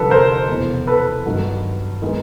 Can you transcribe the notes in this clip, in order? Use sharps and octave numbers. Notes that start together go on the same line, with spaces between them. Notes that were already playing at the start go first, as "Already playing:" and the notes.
Already playing: F1 F2 D3 G3 A4 B4
A#4 C5
F1 E2 B2
A4 B4
G2 D#3 F#3
D#3 G#3 B3